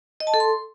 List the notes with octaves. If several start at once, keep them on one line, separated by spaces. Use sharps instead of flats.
D#5
A5
A4
C6